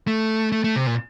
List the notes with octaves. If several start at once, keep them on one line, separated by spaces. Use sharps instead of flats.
A3
A3
A3
C3
A#2